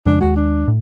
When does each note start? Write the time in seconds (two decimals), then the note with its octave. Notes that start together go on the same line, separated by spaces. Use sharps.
0.06 F2 C#3 G#3 D4
0.21 D#2 G#3 F#4
0.36 D4
0.68 A2